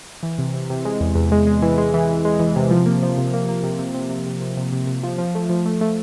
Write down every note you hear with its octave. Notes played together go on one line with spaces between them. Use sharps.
E3
C3
C3
C3
G#3
E2
E2
G#3
G#3
E3
G#3
E3
E3
G#3
E3
C3
F3
A#3
F3
C3
A#3
A#3
C3
C3
C3
C3
C3
C3
C3
C3
C3
F3
F3
A3
F3
A3
A3